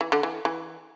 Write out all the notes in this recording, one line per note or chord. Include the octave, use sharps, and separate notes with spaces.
E3
D3
E3
E3